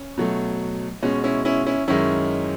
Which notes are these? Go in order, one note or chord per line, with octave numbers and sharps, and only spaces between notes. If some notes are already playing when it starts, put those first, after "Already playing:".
Already playing: C#4
B2 F#3 A3
B2 G#3 C#4
C#4 E4
C#4 E4
C#4 E4
F#2 D#3 G#3 C#4 E4